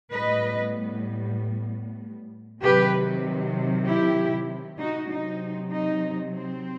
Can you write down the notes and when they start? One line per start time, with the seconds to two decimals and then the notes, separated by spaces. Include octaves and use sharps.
0.13 A2 G3 B3 B4 D#5
2.61 C3 D#3 F#3 G4 B4
3.85 E4 G4
4.78 D#4 F#4
5.09 C3 F#3 C4 D#4
5.71 D#4
6.33 C4